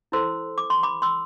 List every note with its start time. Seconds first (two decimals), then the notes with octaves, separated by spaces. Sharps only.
0.12 E4 A4 C5 C6 E6
0.58 D6
0.70 C6
0.83 B5 D6
1.02 C6 E6